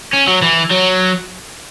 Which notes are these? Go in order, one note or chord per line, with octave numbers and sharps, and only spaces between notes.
C#4
F#3
E3
F#3